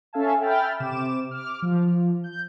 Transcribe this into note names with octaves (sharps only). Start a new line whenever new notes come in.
C#4 A4 E5 F5 G#5 A5
E5 G5 B5 F6 A6
C3 D6 E7
D6 F6
F3
G6